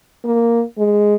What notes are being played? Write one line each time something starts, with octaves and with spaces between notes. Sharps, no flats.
A#3
G#3